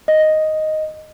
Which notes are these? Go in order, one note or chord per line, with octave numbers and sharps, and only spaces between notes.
D#5